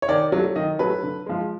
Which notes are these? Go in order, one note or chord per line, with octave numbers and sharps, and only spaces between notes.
C#5
D#3 D5
F#3 A3
D#3 D#5
F#3 A3 B4
D3
F3 G#3